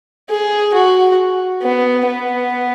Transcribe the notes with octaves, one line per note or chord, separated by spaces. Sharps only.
G#4
F#4
B3
B3